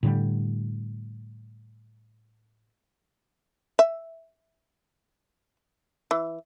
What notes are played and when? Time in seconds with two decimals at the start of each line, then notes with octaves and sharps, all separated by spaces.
0.03 A2 D3 G3
3.79 E5
6.11 E3